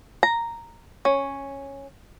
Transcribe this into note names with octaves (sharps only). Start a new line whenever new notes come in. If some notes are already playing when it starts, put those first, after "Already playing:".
A#5
C#4